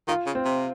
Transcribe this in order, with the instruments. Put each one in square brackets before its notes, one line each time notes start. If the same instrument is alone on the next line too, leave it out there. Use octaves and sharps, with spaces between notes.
[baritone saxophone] D#3 [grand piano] F4
[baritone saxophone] C#3
[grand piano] C4
[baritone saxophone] C3